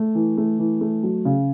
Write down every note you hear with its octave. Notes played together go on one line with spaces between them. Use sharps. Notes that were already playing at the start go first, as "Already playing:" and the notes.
Already playing: A3
E3
A3
E3
A3
F#3
C#3